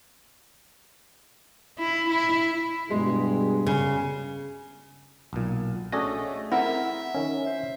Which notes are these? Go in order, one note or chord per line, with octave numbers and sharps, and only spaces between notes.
E4
E4
G2 B2 G#3 G#4
C#3
B1 A#2
A3 C#4 D4 F#4 G#4 A4 D#5
C4 E4 A#4 E5 F#5
D#3 C#4
C5